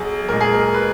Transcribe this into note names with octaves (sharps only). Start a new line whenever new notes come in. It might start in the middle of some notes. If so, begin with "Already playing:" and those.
Already playing: B1 G#4
A#2 G#3 A#4
G#4
A#4
B4